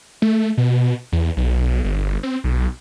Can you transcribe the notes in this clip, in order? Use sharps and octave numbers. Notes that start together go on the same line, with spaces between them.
A3
B2
E2
B1
G1
C4
B1